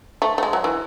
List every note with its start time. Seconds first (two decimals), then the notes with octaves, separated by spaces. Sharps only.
0.22 A3
0.38 A3
0.43 G#3
0.53 F#3
0.64 E3